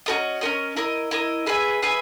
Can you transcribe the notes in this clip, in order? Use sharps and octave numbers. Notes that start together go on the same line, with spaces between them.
C#4 F#4 A#4 D#5
C#4 F#4 A#4 D#5
E4 A#4 D#5
E4 A#4 D#5
G#4 B4 E5 G#5
G#4 B4 E5 G#5